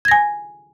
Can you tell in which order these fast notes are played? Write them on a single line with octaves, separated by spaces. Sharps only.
G#6 A#6 G#5